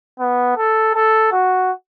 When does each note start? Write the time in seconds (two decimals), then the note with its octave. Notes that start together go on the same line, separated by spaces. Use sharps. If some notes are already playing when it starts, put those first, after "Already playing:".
0.19 B3
0.57 A4
0.94 A4
1.32 F#4